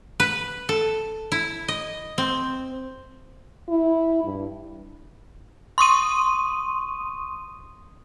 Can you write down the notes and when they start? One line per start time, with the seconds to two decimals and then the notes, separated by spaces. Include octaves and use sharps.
0.20 B4
0.69 A4
1.32 E4
1.68 D#5
2.18 C4
3.68 E4
4.24 G2
5.78 C6 C#6 D#6 D#7